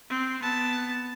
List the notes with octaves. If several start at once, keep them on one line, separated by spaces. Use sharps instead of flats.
C4
B3 A5